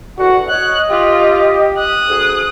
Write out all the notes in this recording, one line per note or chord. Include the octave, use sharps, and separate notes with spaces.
E2 D3 F#4 F#5
C#5 D#5 F#6
F4 G4
D#6 F#6
D2 G#4